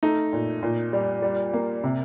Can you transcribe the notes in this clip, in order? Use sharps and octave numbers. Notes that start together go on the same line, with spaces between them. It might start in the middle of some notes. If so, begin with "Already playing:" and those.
A3 D#4
A#2
A#2
G3
G3
A#3
C3